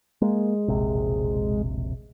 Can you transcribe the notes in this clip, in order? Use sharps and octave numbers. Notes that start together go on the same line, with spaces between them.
G#3 A#3
E1 A#1 C3